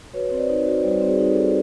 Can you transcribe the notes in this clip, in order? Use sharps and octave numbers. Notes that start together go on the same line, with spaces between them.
F#4 B4 C#5
C4
C5 D5
D#4
F#4
G3 C5 D5
C4
F#4 G#4
D#4
G4 A4
D#4